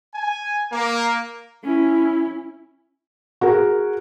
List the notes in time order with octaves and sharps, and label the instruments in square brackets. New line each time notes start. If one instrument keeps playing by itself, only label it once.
[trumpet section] G#5
A#3
[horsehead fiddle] C#4 E4
[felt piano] F#4 G#4 A#4